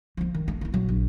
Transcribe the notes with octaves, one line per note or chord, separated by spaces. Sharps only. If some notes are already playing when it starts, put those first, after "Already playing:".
F3 A#3
D#3
A3
A#3 E4
A#2 F#3
A#1